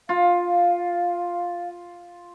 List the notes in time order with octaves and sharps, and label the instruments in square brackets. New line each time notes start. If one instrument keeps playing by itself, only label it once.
[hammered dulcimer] F4 [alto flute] F5